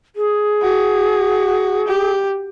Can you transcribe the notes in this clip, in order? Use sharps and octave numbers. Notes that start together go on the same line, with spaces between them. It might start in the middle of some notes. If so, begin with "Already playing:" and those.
G#4
F#4
G4